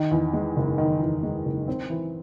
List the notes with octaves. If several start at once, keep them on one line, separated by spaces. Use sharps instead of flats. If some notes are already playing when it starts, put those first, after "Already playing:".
Already playing: D#3
E2
G#3
F#1
D#3
E2
G#3
F#1
C4
E3